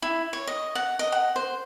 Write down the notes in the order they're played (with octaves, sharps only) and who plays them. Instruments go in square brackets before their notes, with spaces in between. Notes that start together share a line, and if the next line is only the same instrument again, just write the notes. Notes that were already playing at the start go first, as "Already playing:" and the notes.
[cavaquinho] E4
C#5
D#5
F#5
D#5
F#5
C5